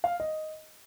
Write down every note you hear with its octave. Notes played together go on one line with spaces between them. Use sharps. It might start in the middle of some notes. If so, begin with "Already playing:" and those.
F5
D#5